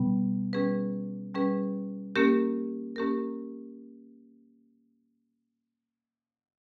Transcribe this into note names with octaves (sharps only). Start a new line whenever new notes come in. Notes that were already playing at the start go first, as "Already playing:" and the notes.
Already playing: B2 G3 B3
G3 C#4 G#4 B4
G3 C#4 G#4 B4
A#3 C#4 G4 A#4
A#3 C#4 G4 A#4